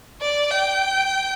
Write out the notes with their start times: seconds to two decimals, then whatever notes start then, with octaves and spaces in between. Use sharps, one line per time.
0.22 D5
0.51 G5